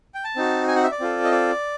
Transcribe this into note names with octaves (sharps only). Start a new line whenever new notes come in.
G5
A5
C4 D#4 F#4
G#5
F#5
E5
D5
C4 F4 A4
D#5
D5